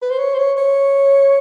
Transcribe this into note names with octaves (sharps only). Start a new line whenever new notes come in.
B4
C5
C#5
C5
C#5
C#5